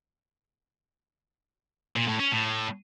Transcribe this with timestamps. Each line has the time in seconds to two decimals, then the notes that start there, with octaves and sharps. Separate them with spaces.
1.96 A#2
2.08 A2
2.20 C#4
2.32 A2